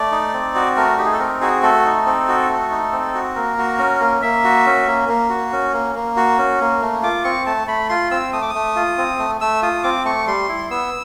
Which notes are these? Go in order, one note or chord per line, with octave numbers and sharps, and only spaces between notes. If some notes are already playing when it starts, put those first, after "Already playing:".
Already playing: A3 D5
D#4
C4
F#4
A3 A#4
D#4 G4
G#4
A4
C4 A#4
F#4 G#4
A3 A4
D#4
C4
F#4
A3
D#4
C4
F#4
A#3 A#4
F#4
C#4
A#3
A#3 E5
F#4
C#4
A#3
A#3
F#4
C#4
A#3
A#3
F#4
C#4
A#3
A3
F4 D6
C4 C#6
A3 A5
A3 B5
F4 C6
C4 E6
A3 D#6
D6
D#6
A3
F4
C4
A3
A3 E6
F4 D#6
C4 D6
A3 C#6
G3 C6
E4
B3 E6